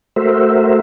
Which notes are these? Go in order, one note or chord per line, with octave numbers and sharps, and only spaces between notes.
A3 F#4 A#4 C5 E5